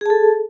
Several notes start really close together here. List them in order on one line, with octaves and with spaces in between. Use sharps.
G#4 A5 A4